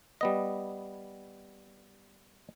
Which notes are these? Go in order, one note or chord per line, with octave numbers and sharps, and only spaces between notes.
G3 B3 D#5